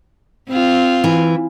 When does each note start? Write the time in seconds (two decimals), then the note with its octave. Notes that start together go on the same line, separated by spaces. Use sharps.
0.49 C4 F4
1.04 E3